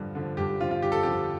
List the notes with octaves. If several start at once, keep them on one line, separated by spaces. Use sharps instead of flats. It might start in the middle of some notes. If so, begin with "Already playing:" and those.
Already playing: G2 D3 F3
D3 F3
G2 G4
D3 F3 F4
F4
G2 G4
A4
D3 F3 G4